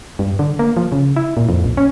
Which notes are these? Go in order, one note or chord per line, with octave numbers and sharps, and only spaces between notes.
G2
D3
A#3
F3
C#3
E4
A#2
F2
A#1
C#4